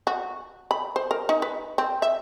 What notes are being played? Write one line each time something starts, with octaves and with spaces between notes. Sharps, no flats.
F#4
B5
C5
A#4
D#4
B4
C4
E5